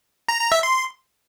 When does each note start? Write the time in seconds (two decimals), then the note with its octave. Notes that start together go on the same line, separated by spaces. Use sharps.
0.28 A#5
0.40 A#5
0.52 E5
0.63 C6